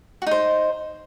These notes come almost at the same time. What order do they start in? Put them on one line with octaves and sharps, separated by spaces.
F#4 D#4 C5